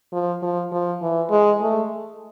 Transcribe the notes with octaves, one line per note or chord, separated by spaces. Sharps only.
F3
F3
F3
E3
G#3
A3